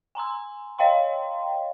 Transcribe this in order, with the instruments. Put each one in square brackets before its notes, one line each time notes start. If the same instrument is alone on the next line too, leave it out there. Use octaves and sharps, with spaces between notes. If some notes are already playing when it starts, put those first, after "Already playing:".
[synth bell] G#5 A#5 C6 E6
C#5 D#5 F5 G5 A#5 C6